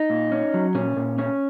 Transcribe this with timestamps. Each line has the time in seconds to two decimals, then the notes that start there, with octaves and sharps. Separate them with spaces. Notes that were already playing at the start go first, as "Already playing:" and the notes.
Already playing: D#4
0.10 A#2
0.32 C#4
0.54 F#3
0.75 A#2 C#4
0.96 A#2
1.19 C#4